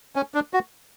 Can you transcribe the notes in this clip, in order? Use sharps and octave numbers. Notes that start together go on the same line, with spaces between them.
C#4
D4
F#4